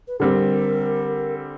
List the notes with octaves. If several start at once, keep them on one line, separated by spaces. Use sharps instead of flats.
B4
D3 G3 C4 A#4